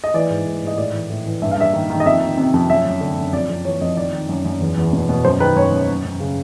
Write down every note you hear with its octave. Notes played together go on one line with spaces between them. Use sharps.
D#5
E3 D5
G#2
G#2
G#2
D#5
A2 D5
E3
A2
E3
G2 E5
F5
G2 E5
D#3
D#3
D#5
F2 E5
D#3
C3
F2
F#2 E5
F#2
D3
F#2
F2 D5
F2
E3 C#5
F2 D#5
D#3 D5
D#3
F#2
F#2
E2
E2
B2
B2
F#2 C5
D#3 B4
F#2 C#5
F#2
F#2
F#2
C#3